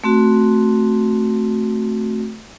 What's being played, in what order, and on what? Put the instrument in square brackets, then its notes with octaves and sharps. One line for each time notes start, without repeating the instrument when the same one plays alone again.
[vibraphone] A3 C4 F#4